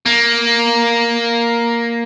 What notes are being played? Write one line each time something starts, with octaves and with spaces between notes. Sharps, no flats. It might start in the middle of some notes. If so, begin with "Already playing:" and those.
A#3